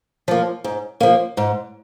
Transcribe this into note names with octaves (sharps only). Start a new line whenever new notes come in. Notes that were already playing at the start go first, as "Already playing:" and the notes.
F3 A#3
G#2
F3 A#3
G#2